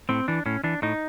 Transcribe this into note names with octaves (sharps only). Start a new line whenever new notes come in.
A2 C4
E3 D4
A2 C#4
E3 D4
A2 D#4